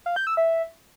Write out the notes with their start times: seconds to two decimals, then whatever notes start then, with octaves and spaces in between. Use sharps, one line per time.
0.06 F5
0.16 G6
0.27 E6
0.37 E5